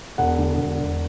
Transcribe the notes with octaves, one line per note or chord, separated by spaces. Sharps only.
E1 F#5
D3
E1
E1